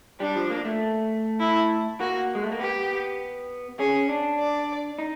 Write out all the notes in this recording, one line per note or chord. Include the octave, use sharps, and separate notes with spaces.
G3 D4
F3
A#3
A3
E4
A#3 F#4
G#3
A3
A#3
B3 G4
C#4 G#4
D4
D5
D#4